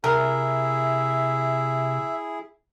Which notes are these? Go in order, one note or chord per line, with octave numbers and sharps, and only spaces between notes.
C3 E4 G#4 A#4 E5